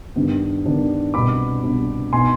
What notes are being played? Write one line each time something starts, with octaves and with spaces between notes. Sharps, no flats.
G2 D#3 B3 D4
G2 D#3 B3 D4
C2 B2 B3 D4 B5 D6
C2 B2 B3 D4
B2 B3 D#4 G#5 C6